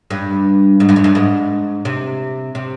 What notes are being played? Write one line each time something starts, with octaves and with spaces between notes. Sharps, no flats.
G2
G#2
G2
F2
G2
G#2
C3
C3